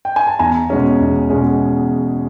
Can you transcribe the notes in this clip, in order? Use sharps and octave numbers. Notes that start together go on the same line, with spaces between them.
G5
G#5
A5
E2 G#5 A#5
B2 G#3 C#4
E2
B2 G#3 C#4